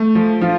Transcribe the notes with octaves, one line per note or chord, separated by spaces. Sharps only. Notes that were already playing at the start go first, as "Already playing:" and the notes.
Already playing: A3
F3
F3 F4